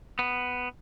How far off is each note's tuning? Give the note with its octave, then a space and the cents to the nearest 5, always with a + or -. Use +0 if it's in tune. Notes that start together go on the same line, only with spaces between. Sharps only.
B3 +5